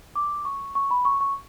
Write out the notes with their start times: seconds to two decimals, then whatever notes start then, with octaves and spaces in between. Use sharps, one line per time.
0.16 D6
0.45 C#6
0.75 C#6
0.91 B5
1.05 C#6
1.21 C#6